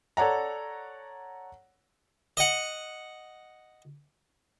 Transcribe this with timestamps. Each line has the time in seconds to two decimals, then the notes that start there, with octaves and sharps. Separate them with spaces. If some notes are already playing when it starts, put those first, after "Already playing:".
0.17 A4 C#5 D5 F#5 A#5
2.37 D#5 F#5